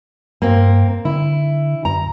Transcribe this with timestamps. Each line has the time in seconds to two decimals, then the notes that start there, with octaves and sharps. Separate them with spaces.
0.42 G2 A#3 C4
1.05 D3 E4
1.85 F#2 A#5